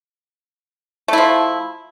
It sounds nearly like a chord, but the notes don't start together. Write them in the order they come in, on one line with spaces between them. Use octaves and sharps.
A3 E4 F3